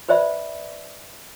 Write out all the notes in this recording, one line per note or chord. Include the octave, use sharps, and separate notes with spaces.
B4 C5 D5 E5 B5